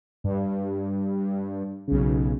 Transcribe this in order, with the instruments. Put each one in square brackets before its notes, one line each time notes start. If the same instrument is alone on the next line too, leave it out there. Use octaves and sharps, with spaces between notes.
[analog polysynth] G2
B1 C#3